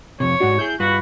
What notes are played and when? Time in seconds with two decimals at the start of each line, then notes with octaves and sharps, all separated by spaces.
0.20 F2 C3 C#5
0.40 G#2 D4 F#4
0.59 E4 G#4 G6
0.80 G2 F4 F#4 B4 B5